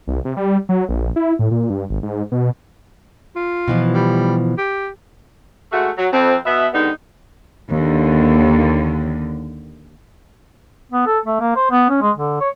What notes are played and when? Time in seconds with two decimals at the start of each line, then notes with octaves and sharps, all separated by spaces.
0.07 C2
0.25 C3
0.37 G3
0.69 F#3
0.89 A#1
1.16 E4
1.39 A2
1.51 A#2
1.70 G2
1.90 G#1
2.03 G#2
2.32 B2
3.36 F4
3.68 B2 E3 F3
3.94 G3
4.58 G4
5.72 G#3 A3 F#4
5.98 F#3
6.13 F2 C4
6.46 B2 B3 E5
6.74 D3 D#3 G3 G#3 B3 D#4
7.70 D#2 D3
10.92 B3
11.06 A4
11.25 A3
11.40 A#3
11.56 C5
11.71 B3
11.90 C#4
12.01 G#3
12.16 D3
12.41 C#5